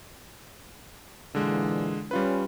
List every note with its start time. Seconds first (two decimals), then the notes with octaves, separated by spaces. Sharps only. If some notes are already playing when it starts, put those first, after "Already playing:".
1.35 A#2 D3 E3 G#3
2.11 G3 C#4 F4 B4